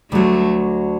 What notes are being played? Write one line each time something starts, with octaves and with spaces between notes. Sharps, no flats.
D2 D3 F#3 A3